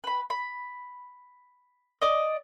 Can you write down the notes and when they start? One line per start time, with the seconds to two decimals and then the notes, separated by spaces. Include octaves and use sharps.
0.04 B4 B5
0.30 B5
2.02 D5 D#5